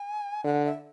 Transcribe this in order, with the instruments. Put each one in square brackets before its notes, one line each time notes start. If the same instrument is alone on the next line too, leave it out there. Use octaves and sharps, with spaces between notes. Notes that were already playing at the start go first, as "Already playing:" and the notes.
Already playing: [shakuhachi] G#5
[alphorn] D3 [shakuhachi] F#5
[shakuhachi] E5